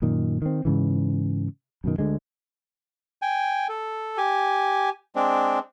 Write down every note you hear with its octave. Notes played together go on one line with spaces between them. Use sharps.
F#2 A#2 D#3
D#3 C4
G#2 C#3 E3
F#2 B2 D#3
D2 D3 G#3
G5 G#5
A4
G4 G#5
G#3 C4 D4